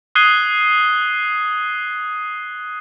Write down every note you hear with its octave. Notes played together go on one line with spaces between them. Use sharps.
D#6 F#6 G#6 C7 D#7 G7